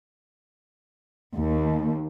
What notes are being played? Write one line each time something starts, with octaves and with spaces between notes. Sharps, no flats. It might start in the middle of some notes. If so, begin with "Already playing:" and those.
D#2